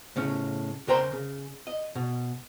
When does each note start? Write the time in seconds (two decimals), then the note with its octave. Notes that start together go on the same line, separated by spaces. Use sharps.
0.16 A2 C#3 C#4
0.88 C#3 A#4 C5 G5 A#5 C6
1.12 C#3
1.67 D#5
1.95 B2